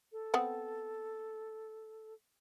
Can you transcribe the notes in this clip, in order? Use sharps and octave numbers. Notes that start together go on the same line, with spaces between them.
A4
B3 C4 F#5